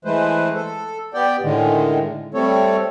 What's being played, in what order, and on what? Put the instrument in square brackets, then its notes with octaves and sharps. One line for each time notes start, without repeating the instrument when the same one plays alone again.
[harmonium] E3 G#3 A3 B4 C5
A4
B3 G4 D5 G5
A2 D3 D#3 G#3
G3 A3 C4 A4 C#5